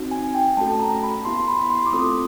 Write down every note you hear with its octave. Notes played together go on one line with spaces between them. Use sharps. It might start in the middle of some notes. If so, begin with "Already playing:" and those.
Already playing: C4 D#4 F#4
G#5
G5
A3 C#4 F#4 A4 A5
A#5
B5
B3 E4 G4 C6
B5
B5
C6
D6
A3 C4 F4 A4 D#6